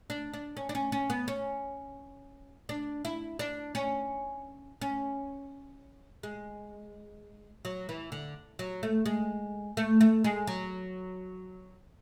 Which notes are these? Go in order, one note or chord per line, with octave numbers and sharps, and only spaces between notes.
D4
D4
C#4
D4
C#4
C#4
B3
C#4
D4
E4
D4
C#4
C#4
G#3
F#3
E3
D3
F#3
A3
G#3
A3
A3
G#3
F#3